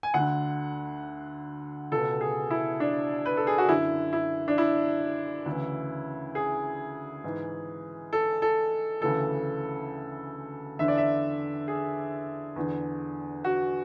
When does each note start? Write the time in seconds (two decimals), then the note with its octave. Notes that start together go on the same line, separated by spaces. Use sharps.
0.03 G#5
0.14 D2 D3 F#5
1.92 C#2 B2 A4
2.21 G#4
2.51 E4
2.80 D4
3.26 B4
3.37 A4
3.47 G#4
3.58 F#4
3.68 F#2 D3 E4
4.13 E4
4.48 D4
4.58 E4
5.46 D2 C#3 E3
6.35 G#4
7.24 G#2 E3
8.13 A4
8.42 A4
9.01 D2 C#3 E3 A4
10.79 E2 D3 E5
10.88 D5
10.98 E5
11.68 G#4
12.56 E2 D3
13.44 F#4